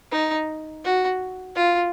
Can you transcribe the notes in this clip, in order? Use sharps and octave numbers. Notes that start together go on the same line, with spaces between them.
D#4
F#4
F4